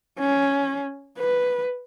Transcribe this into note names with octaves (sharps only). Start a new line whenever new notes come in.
C#4
B4